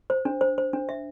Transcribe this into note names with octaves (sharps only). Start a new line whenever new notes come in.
C5
D4
C5
C5
D4
E5